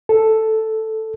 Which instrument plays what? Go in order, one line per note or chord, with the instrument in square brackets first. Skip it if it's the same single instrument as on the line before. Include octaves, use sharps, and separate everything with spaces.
[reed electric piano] A4